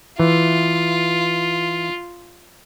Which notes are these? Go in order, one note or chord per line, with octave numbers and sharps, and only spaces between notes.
E3 F4